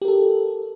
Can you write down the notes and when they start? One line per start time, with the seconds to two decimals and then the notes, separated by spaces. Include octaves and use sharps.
0.02 G4
0.05 A#4
0.08 A4